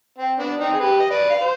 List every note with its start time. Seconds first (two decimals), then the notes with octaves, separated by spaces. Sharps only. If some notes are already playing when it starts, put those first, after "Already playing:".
0.18 C4
0.39 B3 D4
0.60 C4 D#4
0.73 G#4
0.80 G4 B4
1.00 D#5
1.11 B4 D5
1.30 F5
1.41 C5